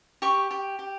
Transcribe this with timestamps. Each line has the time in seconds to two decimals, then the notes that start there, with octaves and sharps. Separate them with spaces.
0.22 G4 C#6
0.51 G4
0.79 G4